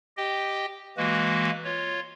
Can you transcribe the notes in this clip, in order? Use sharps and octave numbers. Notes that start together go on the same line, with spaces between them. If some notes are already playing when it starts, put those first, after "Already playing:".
G4 D#5 G5
E3 G#3 A#3 F#4 B4
F4 C#5